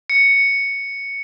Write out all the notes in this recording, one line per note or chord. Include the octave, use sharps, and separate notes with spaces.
C#7